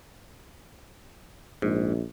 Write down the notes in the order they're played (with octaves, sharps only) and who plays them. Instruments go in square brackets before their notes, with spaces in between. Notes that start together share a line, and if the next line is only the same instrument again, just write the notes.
[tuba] A#1 [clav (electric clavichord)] G#2